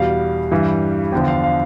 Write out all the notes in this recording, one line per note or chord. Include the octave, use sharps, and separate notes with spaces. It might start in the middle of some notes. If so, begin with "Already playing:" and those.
Already playing: E2 B2 G3 F5
G2 E3 G3
E2 D3 F3 G5
F5
F5